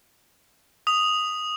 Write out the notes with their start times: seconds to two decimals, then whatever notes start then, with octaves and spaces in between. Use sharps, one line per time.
0.87 D#6 F7